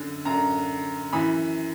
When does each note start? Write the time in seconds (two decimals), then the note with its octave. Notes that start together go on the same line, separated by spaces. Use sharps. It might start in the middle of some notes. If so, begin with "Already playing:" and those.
Already playing: F#2 D3
0.25 F#2 D3 A#5
1.13 F#2 E3 B5